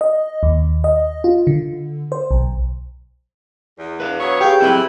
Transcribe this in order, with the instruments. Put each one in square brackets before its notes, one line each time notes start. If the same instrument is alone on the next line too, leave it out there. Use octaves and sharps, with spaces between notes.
[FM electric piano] D#5
D#2
D#5
F4
D3
C5
B1
[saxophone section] E2
[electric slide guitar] B4 E5 F5
[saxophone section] F#3 B3 C#5
[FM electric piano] G4 G#4 [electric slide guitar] F5 [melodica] G5
[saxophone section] E3 G3 E4 [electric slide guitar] F#3 C4 A4